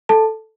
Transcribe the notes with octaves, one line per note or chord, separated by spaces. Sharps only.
A4 A5